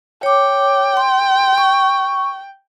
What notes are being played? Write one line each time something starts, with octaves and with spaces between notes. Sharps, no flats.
C#5 G5 D6
C6
C#6